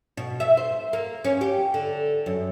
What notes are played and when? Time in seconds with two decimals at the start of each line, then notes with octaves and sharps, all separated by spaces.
0.17 B2
0.40 E5
0.57 C5
0.93 A#3
1.24 C#4
1.41 G4
1.74 D3
2.26 F#2